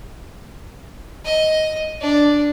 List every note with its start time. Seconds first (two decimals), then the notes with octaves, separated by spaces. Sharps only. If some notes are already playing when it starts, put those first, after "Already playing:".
1.25 D#5
2.01 D4